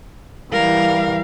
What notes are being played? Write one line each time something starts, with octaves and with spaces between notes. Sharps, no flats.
E3 G3 A#4 F5